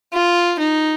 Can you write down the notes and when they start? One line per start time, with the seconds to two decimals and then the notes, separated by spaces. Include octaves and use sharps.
0.13 F4
0.59 D#4